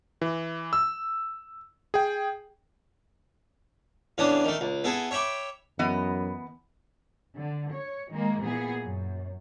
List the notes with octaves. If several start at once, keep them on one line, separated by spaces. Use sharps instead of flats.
E3
E6
G#4 G5
E2 C#3 E3 D4 D#6
D#3 A3
C#2
B3 E4 G#4 A4
C#5 E5 G5 B5 D6
F#2 E3 B3 D#5
D3
C#5
D#3 G#3 A#3
A#2 E3 B3 G#4
F#2